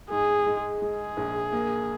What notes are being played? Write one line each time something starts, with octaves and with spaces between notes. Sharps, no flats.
G#2 G#4
G#3
G#3 G#4
A#1
A#3